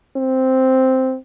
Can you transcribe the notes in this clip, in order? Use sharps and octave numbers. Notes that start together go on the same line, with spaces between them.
C4